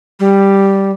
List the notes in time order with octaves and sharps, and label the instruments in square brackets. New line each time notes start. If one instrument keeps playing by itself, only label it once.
[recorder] G3